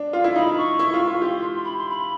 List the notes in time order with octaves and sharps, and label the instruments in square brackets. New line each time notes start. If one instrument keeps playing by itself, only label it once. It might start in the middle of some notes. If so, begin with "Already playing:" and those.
Already playing: [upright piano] D4
[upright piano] F4 [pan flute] F5
[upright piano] E4
[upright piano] D#4 [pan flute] B5
[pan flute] C#6
[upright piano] E4
F4
F4
[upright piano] G4 [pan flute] C6
[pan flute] B5
C6
B5